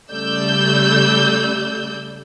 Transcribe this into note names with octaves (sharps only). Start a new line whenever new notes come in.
C#3 G3 A3 D5 E6 G6